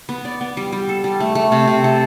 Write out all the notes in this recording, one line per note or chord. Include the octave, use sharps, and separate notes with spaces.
B3
D5
B3
G3
G3
A4
G3
A3
A3
C3
C3
A4